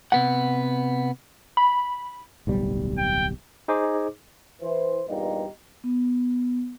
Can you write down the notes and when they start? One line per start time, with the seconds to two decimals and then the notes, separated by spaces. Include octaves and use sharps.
0.12 C3 B3 F#5
1.57 B5
2.47 D1 B1 G3
2.98 G5
3.68 D#4 G#4 C5 D#5 D6
4.62 E3 C5
5.07 E2 G2 A#2 G3 D#4
5.84 B3